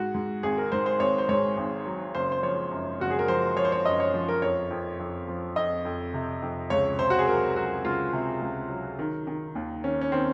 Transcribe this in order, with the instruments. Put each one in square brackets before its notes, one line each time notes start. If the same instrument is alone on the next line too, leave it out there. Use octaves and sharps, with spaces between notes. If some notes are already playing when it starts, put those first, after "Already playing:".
Already playing: [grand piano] G#2 F#4
G#2
G#1 G#4
A#4
G#2 C5
C5
G#1 C#5
C5
G#2 C#5
G#1
F#3
F#1 C5
C5
F3 C#5
F#2
F#1 F#4
G#4
A#4
F3 C5
F3 C#5
C5
C#5
F#2 D#5
C#5
F3
A#4
F2 C#5
F2
F2
F3
F2 D#5
F2
C3
F2
C#2 C#5
C3 C5
F#4
G#4
F#3 A#4
F#3 F#4
C#2 F4
C3
C#2
F#3
D#3
D#3
D#2
D#3 C#4
C#4
D#3 C4